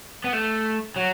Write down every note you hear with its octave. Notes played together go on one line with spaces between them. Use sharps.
B3
A3
F#3